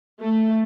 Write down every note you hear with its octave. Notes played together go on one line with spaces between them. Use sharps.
A3